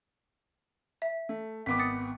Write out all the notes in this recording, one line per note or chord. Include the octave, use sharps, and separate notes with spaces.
E5
A3
G#1 B3 D6 B6
D#6 A6 C#7